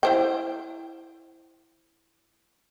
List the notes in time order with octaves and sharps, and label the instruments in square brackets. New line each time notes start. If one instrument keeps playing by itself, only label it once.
[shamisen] E4 C5 G5